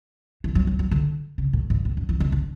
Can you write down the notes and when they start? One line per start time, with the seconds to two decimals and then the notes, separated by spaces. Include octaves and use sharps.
0.44 E3
0.55 F#3
0.67 G#3
0.79 F#3
0.91 D3
1.38 C#3
1.53 A2
1.70 G#2
1.85 A2
1.97 F#2
2.09 E3
2.20 D3
2.32 D3